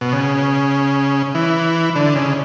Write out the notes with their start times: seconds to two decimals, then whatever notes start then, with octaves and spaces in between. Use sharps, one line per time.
0.01 B2
0.13 C#3
1.35 E3
1.96 D3
2.15 C#3